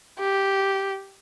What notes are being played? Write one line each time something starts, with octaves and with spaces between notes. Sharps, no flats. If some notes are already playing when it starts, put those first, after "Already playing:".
G4